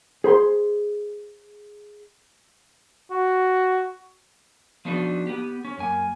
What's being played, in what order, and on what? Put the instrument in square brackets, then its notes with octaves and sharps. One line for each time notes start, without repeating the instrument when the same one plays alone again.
[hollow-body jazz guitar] G#4 C5 B5 C6
[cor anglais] F#4
[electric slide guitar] F3 B3 D4 D#4 F#4 B4
B3 G4
C#4
F#2 A#3 G#5